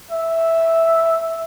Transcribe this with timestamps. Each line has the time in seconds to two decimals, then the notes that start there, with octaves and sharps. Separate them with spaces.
0.12 E5